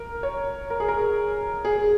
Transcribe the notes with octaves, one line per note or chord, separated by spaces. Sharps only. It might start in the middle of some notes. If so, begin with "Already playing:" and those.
Already playing: A#4
C#5
A#4
G#4
A#4
G#4